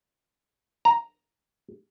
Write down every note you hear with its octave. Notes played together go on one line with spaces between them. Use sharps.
A#5